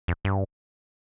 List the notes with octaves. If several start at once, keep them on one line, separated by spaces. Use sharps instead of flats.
F2
G2